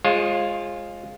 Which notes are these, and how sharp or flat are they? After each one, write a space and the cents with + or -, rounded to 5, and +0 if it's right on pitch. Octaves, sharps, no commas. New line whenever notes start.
G#3 -5 F4 +0 C5 +45